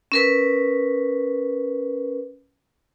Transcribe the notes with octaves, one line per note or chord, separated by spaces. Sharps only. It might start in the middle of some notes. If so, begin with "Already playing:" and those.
C#4 A#4 B4